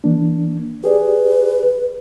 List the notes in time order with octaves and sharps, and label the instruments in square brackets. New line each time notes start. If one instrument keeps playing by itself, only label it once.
[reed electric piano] E3 A#3 D4
[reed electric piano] G4 G#4 D5 [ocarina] B4